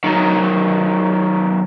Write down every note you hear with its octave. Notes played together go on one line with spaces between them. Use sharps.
D#3 F#3